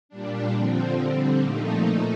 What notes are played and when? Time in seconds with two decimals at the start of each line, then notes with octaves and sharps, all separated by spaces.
0.09 A#2 G3 D4
0.53 D3 F3 C4
0.96 D3 G3 C4
1.40 A#2 F3 A3 D#4
1.84 A#2 A3 D#4